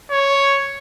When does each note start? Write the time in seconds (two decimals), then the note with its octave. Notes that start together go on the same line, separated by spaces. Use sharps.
0.11 C#5